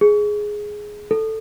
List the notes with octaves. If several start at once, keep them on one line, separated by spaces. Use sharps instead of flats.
G#4
A4